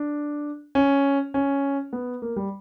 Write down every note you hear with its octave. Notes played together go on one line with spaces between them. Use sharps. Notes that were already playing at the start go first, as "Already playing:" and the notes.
Already playing: D4
C#4
C#4
B3
A#3
G3